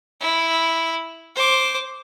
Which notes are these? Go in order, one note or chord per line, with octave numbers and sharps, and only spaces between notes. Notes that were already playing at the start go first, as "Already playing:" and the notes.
E4
C5 D6